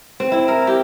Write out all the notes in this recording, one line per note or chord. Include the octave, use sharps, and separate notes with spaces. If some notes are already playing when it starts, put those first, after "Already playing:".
C4
E4
A#4
G4